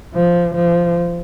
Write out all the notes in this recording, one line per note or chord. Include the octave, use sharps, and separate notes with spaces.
F3
F3